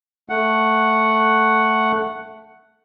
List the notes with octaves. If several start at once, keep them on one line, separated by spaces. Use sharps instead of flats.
A3 F#5